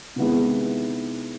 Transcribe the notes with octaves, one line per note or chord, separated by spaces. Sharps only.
C3 D#3 G#3 B3 E4